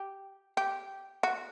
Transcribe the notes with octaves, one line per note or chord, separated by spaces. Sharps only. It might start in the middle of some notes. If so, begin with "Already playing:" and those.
Already playing: G4
G4
F#4